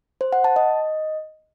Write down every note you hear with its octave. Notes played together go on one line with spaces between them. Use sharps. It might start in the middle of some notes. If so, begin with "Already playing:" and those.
C5
F#5
A5
D#5